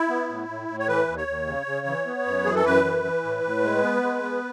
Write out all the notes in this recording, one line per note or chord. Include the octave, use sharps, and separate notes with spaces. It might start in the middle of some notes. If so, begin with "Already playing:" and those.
Already playing: E4
B3
A2
A2
A2
C#5
E3 B4
D#2
C#5
D#2
C#3
C#3
E3
B3
F#2
E3 G#4
A4
F#2 B4
E3
E3
A2
A2
G#3
B3
G#3
B3